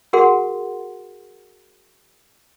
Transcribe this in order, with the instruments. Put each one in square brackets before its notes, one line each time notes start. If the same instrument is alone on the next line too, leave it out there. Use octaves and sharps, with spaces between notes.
[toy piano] F#4 G#4 A#4 F#5 C6